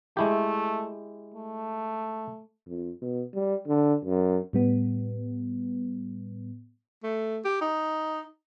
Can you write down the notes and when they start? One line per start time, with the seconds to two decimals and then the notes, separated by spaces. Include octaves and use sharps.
0.17 G#3 A3 E4 G4
1.34 A3
2.68 F2
3.02 B2
3.34 G3
3.67 D3
4.05 F#2
4.53 A2 G3 B3
7.03 A3
7.45 G4
7.61 D#4